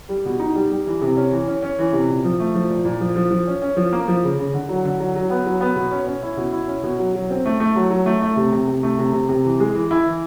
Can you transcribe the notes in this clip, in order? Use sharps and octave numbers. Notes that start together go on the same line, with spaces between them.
G3
B2
D#4
G3
G3
E3
C3
C#4
E3
C#4
C#4
E3
C3
A#2
F3
A3
F3
A#2
A#2
F3
F3
F3
C#4
C#4
F3
A#3
F3
C#3
C#3
D3
F#3
D3
F#3
F#3
B3
F#3
B3
B2
C#4
C#4
E4
B2
E4
C#4
B2
F#3
F#3
C4
A3
A3
F#3
F#3
A3
A3
C3
C3
C3
A3
C3
C3
C3
E3
G#3
E3
E4
E3